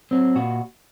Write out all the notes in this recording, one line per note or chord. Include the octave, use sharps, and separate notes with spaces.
F#3 C4
A#2 F#4